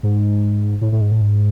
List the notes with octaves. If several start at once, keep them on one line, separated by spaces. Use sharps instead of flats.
G#2
A2
A2
G#2
A2
G#2